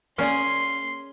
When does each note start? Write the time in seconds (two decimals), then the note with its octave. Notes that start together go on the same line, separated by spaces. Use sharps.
0.18 A#3 C#4 G#4 D5 C6